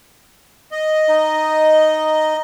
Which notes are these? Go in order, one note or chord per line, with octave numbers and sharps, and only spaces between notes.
D#5
D#4